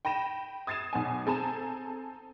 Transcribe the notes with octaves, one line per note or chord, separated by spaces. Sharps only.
G5 B5 A#6 D#7 E7
D#6 G#6 A6 C7 D#7 E7
B1 B3 G#5
C4 A4 G#5 A#5 E7